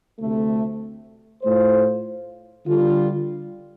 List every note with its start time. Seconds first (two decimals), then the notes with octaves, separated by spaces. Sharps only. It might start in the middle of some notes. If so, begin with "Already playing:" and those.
0.20 D2 C3 A3
1.42 A2 A3 F4 C5
2.66 D3 G3 F4